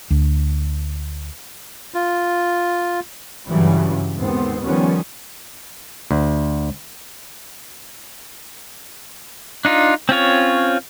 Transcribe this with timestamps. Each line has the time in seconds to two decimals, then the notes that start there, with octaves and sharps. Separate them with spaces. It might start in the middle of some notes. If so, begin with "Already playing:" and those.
0.10 D2
1.94 F4
3.46 G2 C#3 E3 F#3 G3
4.16 D#2 G#2 B3 C4
4.64 D#3 F3 G3 B3 C#4
6.11 D2
9.65 D4 D#4 F4
10.09 C4 C#4 F4 C#5